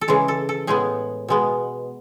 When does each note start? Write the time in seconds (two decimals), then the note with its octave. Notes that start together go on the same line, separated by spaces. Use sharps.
0.01 A4
0.08 C#3 E3 G#3 G#4
0.28 A4
0.49 A4
0.67 A2 G#3 B3 G#4
1.28 B2 G#3 B3